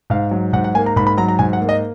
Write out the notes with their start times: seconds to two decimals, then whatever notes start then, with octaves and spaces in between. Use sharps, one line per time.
0.10 G#2 F5
0.31 F#3
0.53 G#2 F#5
0.64 F#5
0.75 A#3 G#5
0.86 A#5
0.96 G#2 B5
1.07 B5
1.17 F#3 A#5
1.28 A#5
1.39 G#2 G#5
1.53 F#5
1.61 A#3
1.69 D#5